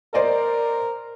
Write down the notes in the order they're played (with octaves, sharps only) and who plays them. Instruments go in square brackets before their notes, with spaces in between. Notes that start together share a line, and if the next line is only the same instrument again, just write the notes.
[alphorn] A#4 [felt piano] C5 D5 D#5